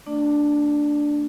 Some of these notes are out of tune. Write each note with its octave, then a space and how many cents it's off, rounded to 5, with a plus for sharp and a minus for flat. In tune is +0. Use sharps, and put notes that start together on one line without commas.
A3 +35 D4 +0 D5 +10